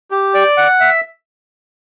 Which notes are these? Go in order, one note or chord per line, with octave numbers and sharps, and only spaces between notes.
G4
D5
F#5
E5